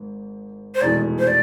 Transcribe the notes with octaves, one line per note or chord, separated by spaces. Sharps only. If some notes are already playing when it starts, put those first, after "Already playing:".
Already playing: G#1 G#2
C5
F1 E2 B2 G#3 D5
C5
D5